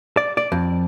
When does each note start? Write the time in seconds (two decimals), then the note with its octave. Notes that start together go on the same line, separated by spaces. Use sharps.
0.17 D5
0.37 D5
0.52 F2